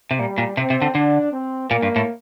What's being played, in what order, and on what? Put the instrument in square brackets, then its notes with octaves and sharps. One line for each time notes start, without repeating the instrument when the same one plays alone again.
[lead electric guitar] C3
[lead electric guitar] A#2 [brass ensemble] G3
[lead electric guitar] A#2
[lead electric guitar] C3 [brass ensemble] C4
[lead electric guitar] C3
D3
[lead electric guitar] D3 [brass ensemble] D4
[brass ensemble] C4
[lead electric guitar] A#2 [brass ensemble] A#3
[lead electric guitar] G2
A2